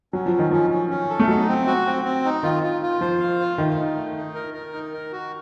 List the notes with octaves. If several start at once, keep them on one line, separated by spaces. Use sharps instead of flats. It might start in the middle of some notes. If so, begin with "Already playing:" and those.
F#3 C#4
F3
C#4
D#3
F3 C#4
C#4
C#4
A4
A3
F#3 D#4
C4
F#4
C4
C4
D#4
D#3 F4
F4
F4
F3 C5
F5
F4
D#3 A3
D#4
A3
D#4
A#4
A#4
D#4
A#4
F#4